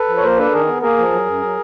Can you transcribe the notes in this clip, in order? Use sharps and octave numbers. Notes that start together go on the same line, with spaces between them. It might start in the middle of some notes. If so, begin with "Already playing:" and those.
Already playing: A4 B4
F3
C#5
A#3 A#4 C5
D4 A4 B4
D#3 G#4 A#4
B3
A#3 G#4 A#4
F3
F#3
F#2
F#3